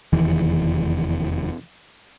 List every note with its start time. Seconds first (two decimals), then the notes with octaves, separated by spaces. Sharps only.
0.13 F1 E2 D#3 E3